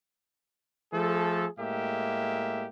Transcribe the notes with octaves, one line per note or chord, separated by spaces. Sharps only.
F3 A3 G#4 A4
A2 G#3 A#3 G4 E5